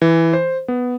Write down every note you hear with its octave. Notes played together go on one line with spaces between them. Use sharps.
E3
C5
B3